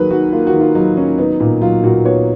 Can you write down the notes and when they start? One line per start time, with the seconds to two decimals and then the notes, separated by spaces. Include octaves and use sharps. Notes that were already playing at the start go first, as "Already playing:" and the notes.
Already playing: D#3 F#3 A#3 G#4 A#4 B4
0.11 D#3 F#4
0.32 A#3 F4
0.47 F#4
0.53 D#3
0.60 F4
0.75 F#3 D#4
0.97 D#3 C#4
1.18 B3 D#4
1.40 A#2 D#4
1.61 F#3 F4
1.83 A#2 F#4
2.05 B3 C#5